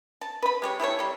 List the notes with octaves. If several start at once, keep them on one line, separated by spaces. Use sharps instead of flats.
A5
B4 B5
G#3 G4 C#5
E4 G4 A4 C#5
C3 G3